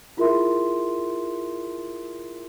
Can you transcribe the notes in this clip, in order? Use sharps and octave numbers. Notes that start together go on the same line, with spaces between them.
E4 F4 G#4 A#4 E5 C6